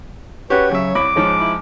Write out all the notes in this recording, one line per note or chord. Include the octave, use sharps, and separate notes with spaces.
C#4 F#4 G4 B4 C#5
C#3 F#3 E5
C2 B5 D6
G#2 F3 G#3 C#4
E4